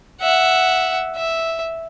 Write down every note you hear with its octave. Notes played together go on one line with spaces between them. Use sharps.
E5 F#5
E5